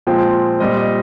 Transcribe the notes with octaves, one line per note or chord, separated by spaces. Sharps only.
A#2 F3 G#3 C4 G5
A#2 G3 C4 D#5
D#5